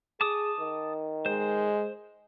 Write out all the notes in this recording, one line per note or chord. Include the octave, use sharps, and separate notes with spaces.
G#4 A5 D6 D#6
D#3
G#3 C5